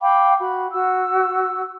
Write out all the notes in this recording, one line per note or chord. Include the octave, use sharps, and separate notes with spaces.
F5 G5 B5 D6
F#4 B5
F#4 E6